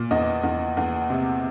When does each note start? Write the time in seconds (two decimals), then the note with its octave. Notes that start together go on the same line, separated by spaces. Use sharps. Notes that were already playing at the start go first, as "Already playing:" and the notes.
Already playing: A#2
0.11 E2 D#5
0.43 E2
0.77 E2
1.10 C3